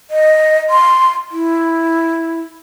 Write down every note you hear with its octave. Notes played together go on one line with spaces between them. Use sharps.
D#5
C6
E4